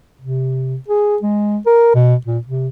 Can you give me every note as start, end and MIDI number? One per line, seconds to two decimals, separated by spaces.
0.20 0.76 48
0.88 1.17 68
1.22 1.58 56
1.66 1.93 70
1.94 2.15 47
2.26 2.38 46
2.46 2.68 48